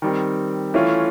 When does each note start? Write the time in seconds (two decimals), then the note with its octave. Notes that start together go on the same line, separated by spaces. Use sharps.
0.02 D#3 G3 C4
0.74 E3 A3 C#4 F4